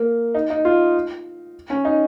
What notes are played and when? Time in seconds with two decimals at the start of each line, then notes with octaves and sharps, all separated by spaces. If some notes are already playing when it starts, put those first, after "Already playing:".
Already playing: A#3
0.35 D#4
0.50 D#4
0.65 F4
1.70 C#4
1.85 D#4